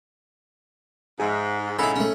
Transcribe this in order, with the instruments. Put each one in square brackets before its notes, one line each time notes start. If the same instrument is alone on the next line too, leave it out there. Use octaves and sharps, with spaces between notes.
[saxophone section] G#2 [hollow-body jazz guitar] G#4 E5
[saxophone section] G#2 C#3 G#3 [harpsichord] E4 A4 [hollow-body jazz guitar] G#5 B5
[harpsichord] A3 C#4